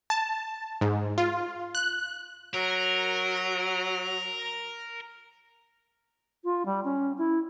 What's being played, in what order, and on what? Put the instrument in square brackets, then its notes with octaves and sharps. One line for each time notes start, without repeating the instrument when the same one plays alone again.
[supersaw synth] A5
G#2
F4
F#6
[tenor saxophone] F#3 [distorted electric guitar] A#4
[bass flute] F4
G3
C#4
E4